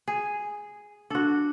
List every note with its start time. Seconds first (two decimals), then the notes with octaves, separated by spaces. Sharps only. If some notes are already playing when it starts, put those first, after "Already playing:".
0.08 G#4
1.11 D4 F#4 A4